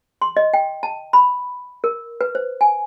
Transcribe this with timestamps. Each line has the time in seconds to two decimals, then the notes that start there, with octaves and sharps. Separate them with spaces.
0.22 C6
0.37 D#5
0.54 G5
0.83 A5
1.13 B5
1.84 A#4
2.21 B4
2.35 C5
2.61 G#5